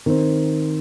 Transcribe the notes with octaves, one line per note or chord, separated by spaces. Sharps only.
D#3 C4